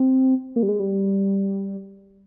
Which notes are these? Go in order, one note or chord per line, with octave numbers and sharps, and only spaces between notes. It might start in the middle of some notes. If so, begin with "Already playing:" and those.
Already playing: C4
A#3
G3
G#3
G3